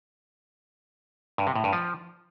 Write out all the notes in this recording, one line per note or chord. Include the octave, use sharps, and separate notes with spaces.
G2
C3
A2
G2
F3